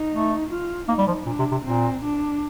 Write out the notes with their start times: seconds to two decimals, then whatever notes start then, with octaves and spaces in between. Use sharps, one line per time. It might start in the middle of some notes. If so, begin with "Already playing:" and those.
Already playing: D#4
0.12 A3
0.50 F4
0.88 A#3 D#4
0.98 G3
1.07 F3
1.26 A#2 D4
1.39 C3
1.51 C3
1.65 A#2 C4
2.03 D4